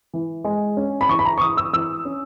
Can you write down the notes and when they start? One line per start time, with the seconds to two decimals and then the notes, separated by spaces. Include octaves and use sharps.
0.13 E3
0.44 G#3
0.77 C#4
1.01 B5
1.09 E3 C#6
1.19 B5
1.25 A#5
1.38 C#6
1.41 E3 D#6
1.57 E6
1.73 E3 E6
2.05 C#4